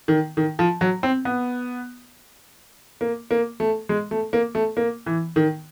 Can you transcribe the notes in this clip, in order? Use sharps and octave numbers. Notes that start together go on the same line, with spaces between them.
D#3
D#3
F3
F#3
C4
B3
A#3
A#3
A3
G#3
A3
A#3
A3
A#3
E3
D#3